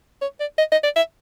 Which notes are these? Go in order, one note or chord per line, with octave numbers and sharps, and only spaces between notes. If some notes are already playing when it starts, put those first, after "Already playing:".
C#5
D5
D#5
D#5
D5
E5